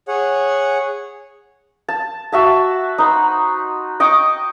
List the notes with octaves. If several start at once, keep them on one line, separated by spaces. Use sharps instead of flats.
G#4 C#5 F#5
A5
F#4 E5 A5
D#4 C5 B5
D#5 G5 C#6 D6